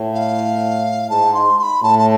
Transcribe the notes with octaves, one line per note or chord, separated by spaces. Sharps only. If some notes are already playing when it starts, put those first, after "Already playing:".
Already playing: A2
F5
G#2 A5
C6
C6
B5
A2 A5
A5